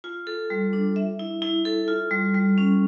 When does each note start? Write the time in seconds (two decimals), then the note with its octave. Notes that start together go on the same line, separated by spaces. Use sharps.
0.04 F4
0.27 A4
0.50 G3
0.73 D4
0.96 E5
1.19 E4
1.42 E4
1.65 A4
1.88 F4
2.11 G3
2.35 G3
2.58 C#4